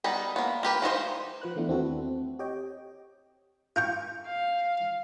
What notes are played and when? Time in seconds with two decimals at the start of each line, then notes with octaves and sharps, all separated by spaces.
0.04 G3 B3 D#4 B4
0.36 A#3 B3
0.63 A#3 G4 B4
0.82 F3 D#4 F#4 C5
1.42 F3 B4 F#6
1.56 E3 A3 B3 D4 E4
1.68 D#2 C4 E4 F#4 A4
2.02 C4
2.39 G4 C#5 D#5 G5
3.76 F4 G5 C#6
4.26 F5